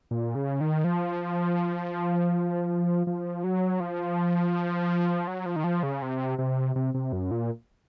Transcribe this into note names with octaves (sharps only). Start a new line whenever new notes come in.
A#2
C#3
D#3
F3
F3
F#3
F3
F#3
F3
D#3
F3
C#3
C3
C3
C3
C3
F#2
A#2